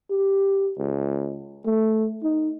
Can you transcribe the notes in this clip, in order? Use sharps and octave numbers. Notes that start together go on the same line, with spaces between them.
G4
C#2
A3
D#4